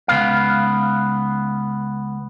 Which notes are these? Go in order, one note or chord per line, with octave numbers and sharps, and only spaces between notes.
C#2 A#2 B3 F5